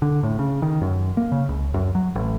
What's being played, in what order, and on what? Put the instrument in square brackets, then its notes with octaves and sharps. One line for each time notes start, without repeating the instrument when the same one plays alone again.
[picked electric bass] D3
A2
C#3
D#3
F#2
A#3
C#3
C#2
F#2
F#3
A1